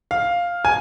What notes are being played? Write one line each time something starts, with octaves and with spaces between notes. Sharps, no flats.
F5
G#5